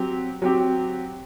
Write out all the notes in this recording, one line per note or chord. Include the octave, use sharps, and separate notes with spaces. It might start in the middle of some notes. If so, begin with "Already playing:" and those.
Already playing: F#3 C4 G4
F#3 C4 G4